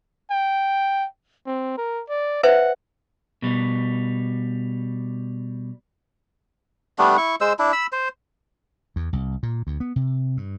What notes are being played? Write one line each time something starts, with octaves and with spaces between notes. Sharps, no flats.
G5
C4
A#4
D5
B4 C5 E5 F#5
B2 G3
G3 A3 B3 D4
E4 C#6
G#3 C5 E6
D4 E4
B5 E6
C5
E2
C2
A#2
D2
B3
C3
G2